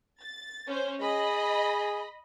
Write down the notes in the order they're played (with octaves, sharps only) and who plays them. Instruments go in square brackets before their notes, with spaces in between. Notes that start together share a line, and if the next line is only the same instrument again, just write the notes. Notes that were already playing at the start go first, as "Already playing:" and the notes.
[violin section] A6
C#4 C5
[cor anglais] G#4 [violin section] D#5 B5